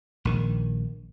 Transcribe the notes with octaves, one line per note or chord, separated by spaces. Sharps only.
A#1 D#3